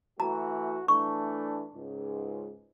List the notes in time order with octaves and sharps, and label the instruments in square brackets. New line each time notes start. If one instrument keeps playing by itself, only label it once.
[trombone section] E3 A3 F#4 [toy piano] A#5
[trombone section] E3 A3 D4 [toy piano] C#6
[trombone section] C#2 G#2